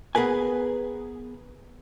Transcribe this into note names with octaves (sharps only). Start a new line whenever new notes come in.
B3 G#4 A#4 B4 G#5